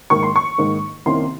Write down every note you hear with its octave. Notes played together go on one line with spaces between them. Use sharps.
G#2 D#3 A#3 C#6
C6
C#6
G#2 D#3 A#3
C2 C3 D#3 A#3 C#4 C6